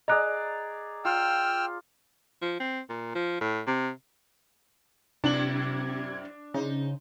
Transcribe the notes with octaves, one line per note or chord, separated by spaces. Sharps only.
G#4 D5 D#5 A#5 F#6
F4 G5 E6 F6
F3
C4
A#2
F3
A2
C3
F#2 C3 C4 D4 E4 G#6 F#7
C#3 D#4 C5